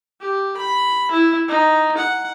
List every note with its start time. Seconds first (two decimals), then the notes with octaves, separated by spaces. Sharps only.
0.20 G4
0.57 B5
1.11 E4
1.48 D#4
1.97 F#5